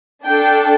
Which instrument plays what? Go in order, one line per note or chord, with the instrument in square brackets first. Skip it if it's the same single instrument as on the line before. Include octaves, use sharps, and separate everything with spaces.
[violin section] D4 A4 G5